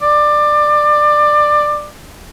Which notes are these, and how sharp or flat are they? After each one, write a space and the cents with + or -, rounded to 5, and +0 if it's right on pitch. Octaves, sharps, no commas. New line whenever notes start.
D5 +20